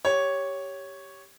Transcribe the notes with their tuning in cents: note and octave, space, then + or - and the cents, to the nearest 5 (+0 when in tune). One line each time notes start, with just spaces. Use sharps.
G4 +0 C#5 +0